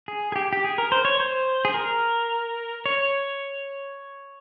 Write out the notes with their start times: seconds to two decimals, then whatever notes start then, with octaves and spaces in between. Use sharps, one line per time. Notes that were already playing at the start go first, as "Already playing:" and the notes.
0.08 G#4
0.32 G#4
0.36 G4
0.53 G4
0.64 G#4
0.78 A#4
0.92 C5
1.05 C#5
1.20 C5
1.65 G#4
1.74 A#4
2.86 C#5